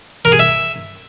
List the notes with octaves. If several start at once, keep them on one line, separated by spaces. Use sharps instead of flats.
A#4
G#4
E5